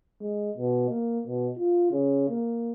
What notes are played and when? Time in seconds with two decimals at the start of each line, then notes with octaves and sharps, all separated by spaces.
0.22 G#3
0.57 B2
0.89 A#3
1.27 B2
1.58 F4
1.92 C#3
2.29 A#3